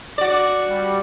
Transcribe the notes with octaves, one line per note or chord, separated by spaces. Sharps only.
F#4 D5 D6
G3